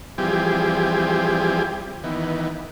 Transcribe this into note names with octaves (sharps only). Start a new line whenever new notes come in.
E3 F3 G3 C4 G4 G#4
D#3 E3 B3